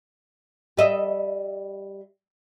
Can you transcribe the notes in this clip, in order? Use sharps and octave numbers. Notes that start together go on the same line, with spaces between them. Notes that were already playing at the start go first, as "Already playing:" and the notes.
G3 D#5 E5